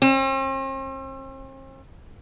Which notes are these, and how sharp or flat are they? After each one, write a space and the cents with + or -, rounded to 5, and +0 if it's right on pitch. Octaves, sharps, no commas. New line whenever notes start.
C4 +45